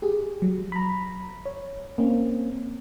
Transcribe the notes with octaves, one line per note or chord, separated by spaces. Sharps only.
G4 G#4
F#3
A#5 B5
C#5
A#3 C4 C#4